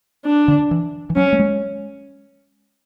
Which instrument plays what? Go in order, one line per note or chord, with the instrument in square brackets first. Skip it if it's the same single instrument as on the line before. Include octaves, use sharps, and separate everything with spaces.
[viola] D4
[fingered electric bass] D3
E3
E3
[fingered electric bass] F#3 [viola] C#4
[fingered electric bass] A3
G#3